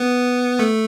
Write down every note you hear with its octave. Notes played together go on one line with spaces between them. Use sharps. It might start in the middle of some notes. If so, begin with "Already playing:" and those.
Already playing: B3
A3